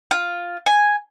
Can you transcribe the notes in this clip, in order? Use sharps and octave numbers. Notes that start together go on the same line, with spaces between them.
F4
G#5